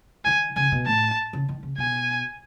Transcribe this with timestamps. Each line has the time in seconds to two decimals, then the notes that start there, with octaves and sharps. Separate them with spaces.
0.25 D#3 G#5
0.56 C#3 G#5
0.72 B2
0.87 A2 A5
1.33 C#3
1.49 D#3
1.63 C#3
1.78 B2 G#5